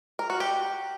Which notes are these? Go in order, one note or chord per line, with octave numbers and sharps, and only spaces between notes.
A#4
F#4
G4